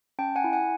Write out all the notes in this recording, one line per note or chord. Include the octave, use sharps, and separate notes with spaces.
C#4 G5 A5
F#5 G#5
E4
F#5 G#5